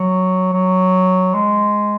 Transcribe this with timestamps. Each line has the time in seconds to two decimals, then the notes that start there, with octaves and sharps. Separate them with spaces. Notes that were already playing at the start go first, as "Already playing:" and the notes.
Already playing: F#3
0.53 F#3
1.34 G#3